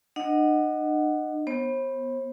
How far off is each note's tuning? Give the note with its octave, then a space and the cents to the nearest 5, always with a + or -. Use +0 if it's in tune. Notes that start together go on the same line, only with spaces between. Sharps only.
D4 +45 D#5 +0 F#5 +0
B3 +0 C5 +40